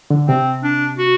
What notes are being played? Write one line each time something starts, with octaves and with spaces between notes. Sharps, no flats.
D3
C3 C4
D4
F#4